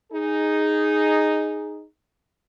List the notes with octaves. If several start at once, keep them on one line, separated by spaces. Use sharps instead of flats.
D#4 G#4